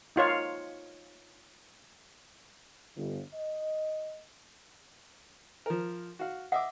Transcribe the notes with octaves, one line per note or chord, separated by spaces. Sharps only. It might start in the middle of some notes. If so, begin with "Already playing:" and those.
D#4 F4 C#5 F5
G1
D#5
F3 A#4
F#4 F5
D#5 E5 F#5 D6